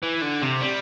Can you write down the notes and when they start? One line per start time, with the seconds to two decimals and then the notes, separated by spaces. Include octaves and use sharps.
0.03 E3
0.22 D3
0.42 C3
0.61 G3